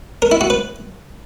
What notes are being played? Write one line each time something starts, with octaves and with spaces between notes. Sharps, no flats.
A#4
E4
F#4
B4